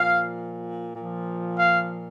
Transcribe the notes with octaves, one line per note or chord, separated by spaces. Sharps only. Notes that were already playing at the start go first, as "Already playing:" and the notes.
Already playing: A#2 F3 F5
A#2 F3
F5